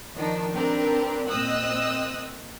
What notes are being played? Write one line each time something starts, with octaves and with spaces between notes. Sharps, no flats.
D#3 F3 D4 D#4
C4 D4 G4 A#4 B4 D5
A#2 C4 D#5 D#6 E6 F#6